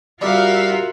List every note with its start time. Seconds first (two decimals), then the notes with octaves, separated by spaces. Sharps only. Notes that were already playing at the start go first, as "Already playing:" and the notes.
0.21 G3 F4 F#4 A#4 E5 F5